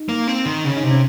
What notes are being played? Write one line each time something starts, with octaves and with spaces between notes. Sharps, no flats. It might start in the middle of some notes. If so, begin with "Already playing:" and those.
Already playing: D#4
A#3
C4
D#3
C#3 C#4
D#4
C3
C#4